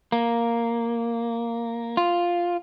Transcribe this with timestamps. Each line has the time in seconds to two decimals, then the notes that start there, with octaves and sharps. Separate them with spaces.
0.12 A#3
1.97 F4